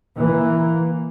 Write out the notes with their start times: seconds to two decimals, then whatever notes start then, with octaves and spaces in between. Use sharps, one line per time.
0.17 E3 A#3